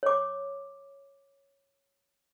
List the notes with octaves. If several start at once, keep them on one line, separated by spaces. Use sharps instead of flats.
C#5 D6